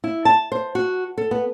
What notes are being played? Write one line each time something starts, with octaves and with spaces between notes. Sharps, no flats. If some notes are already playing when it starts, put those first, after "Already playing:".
E4
A5
C5
F#4
A4
B3